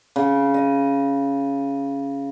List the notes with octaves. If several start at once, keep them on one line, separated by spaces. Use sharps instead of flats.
C#3
D#5